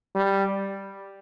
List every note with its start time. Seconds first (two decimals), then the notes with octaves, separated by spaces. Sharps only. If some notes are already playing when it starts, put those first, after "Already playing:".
0.15 G3